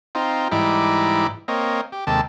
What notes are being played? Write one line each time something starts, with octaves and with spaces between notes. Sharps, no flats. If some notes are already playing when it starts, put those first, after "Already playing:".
C4 D#4 F4
G#2 E3 G3 D#4 E4 D6
A#3 C4 C#5 D#5
G4
D#2 C3 G#3 G4 A4 A5